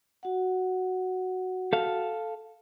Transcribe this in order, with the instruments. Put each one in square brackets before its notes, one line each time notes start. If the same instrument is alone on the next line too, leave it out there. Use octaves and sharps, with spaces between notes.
[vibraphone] F#4 F#5
[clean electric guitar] A4 F5